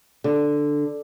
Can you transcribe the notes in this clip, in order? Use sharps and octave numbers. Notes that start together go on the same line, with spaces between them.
D3